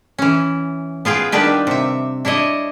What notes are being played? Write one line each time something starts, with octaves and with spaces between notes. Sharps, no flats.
E3 C#4
B3 F4 G#4 G5
D#3 G3 D4 G4 B4
C3 E5
D4 E4 C#5 D#5